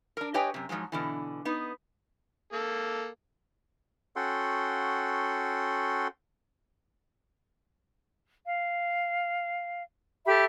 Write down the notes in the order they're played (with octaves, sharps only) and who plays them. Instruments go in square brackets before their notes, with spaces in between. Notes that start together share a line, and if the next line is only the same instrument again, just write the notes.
[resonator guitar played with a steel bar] D4 A#4
G4 B4 C#5 D#5 G5 G#5
F#2 C3
G#2 C#3 F3 F#3 G#3
B2 D3 E3
B3 D#4
[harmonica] A#3 A4
[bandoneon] C#4 F#4 A4 F#5 G5 C6
[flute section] F5
G4 A4 E5 B5